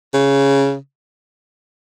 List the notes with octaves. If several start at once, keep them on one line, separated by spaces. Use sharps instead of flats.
C#3